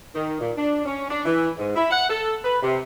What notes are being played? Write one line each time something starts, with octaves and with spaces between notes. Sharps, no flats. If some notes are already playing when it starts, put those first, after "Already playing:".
D#3
A#2
D4
C#4
D4
E3
G#2
E4
F#5
A4
B4
C3